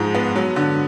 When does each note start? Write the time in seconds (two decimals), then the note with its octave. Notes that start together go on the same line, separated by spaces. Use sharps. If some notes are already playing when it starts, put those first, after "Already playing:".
Already playing: G#2 F3 G#3
0.15 B3
0.36 F#3
0.56 D3